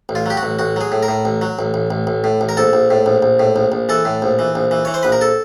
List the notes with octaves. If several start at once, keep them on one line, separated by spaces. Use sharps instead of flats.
A1
F4
F#3 G4
F#4
A1
A1 F#4
F#3 G#4
A2
A#4
A2
A1
F#3
A1
A1
A1
A1
A2
A1
A#4
A#1 A4
A#1
A2
A#1
A#1
A2
A#1
A#1
E3 A4
A2
A#1
E3
A#1
E3
E3 C#5
C5
A#1 B4
A#4
A4